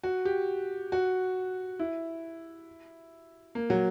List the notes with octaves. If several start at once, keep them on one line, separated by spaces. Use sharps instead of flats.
F#4
G4
F#4
E4
A#3
F#3